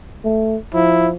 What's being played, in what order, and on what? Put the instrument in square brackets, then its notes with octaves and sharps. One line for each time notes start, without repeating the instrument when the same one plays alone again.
[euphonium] A3
[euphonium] F3 [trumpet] E4